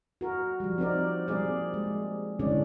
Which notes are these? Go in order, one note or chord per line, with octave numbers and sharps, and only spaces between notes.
F#4 A#4
F3 G3
C4 D#4 A#4 D5
G3 A#3 C4 G#4 D5
G#3
D3 E3 G#3 C#4 D4 D5